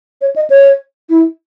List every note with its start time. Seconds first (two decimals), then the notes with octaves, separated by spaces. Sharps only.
0.21 C#5
0.36 D#5
0.50 C#5
1.10 E4